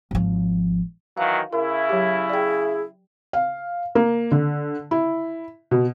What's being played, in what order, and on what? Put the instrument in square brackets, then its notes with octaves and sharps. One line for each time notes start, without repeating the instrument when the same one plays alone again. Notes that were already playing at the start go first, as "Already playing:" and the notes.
[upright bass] G#1 F3
[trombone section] D#3 E3 F#3 [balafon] F5
[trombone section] C#3 E4 [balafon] A#4
[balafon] F#3 G4
[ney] G#4 [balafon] D5 G5
[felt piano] F5
A#3
D3
E4
B2